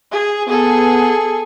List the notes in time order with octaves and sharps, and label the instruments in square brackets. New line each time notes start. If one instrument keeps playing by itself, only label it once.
[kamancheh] G#4
[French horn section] B3 [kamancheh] G#4 A4